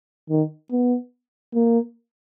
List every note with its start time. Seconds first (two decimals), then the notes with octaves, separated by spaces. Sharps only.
0.30 D#3
0.71 B3
1.54 A#3